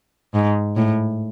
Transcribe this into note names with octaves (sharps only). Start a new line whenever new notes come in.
G#2
A2